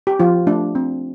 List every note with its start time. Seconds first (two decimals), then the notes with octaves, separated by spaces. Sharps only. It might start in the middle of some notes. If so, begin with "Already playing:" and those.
0.07 G4
0.19 F3 F4
0.47 A3 D4
0.75 C4